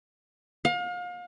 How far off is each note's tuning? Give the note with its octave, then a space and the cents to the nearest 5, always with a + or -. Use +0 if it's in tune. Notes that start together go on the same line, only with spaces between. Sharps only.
F5 +35